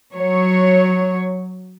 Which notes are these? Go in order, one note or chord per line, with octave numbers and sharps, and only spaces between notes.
F#3 C#5